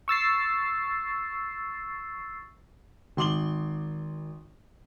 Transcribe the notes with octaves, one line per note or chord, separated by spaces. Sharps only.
C#6 E6 A6 C7
G#1 C6 D6 F#7 G7